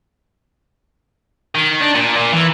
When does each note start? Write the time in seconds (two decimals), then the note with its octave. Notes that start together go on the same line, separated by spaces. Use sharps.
1.55 D#3
1.81 D4
1.95 A#2
2.17 A#2
2.33 E3